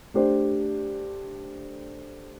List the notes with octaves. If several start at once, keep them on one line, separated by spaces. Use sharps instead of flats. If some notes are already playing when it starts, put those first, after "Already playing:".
A3 D4 G4 C5